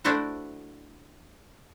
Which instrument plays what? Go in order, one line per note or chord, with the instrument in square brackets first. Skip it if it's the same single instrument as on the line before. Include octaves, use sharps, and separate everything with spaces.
[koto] A3 D4 E4 F#4 C5 F#5